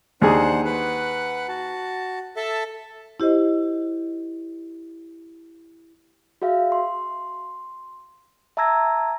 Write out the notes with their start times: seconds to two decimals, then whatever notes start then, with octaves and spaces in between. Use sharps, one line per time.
0.22 D#2 D4 G#4 C5 F#5
0.65 B4 F#5
1.48 F#4 A5
2.36 A4 E5 A5
3.20 E4 G4 C5 D#5
6.42 F#4 G#4 E5 F5
6.72 C6
8.57 E5 A5 A#5 E6 G#6 A#6